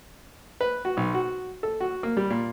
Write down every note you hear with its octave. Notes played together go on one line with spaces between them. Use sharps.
B4
F#4
B1
F#4
A4
F#4
A#3
G3
A#2